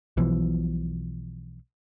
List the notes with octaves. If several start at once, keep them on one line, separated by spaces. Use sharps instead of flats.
B1 B2 E3 F3